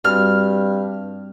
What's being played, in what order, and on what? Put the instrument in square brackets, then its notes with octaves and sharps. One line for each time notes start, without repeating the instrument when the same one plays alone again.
[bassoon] G2 [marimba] G3 C4 F#4 [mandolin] F6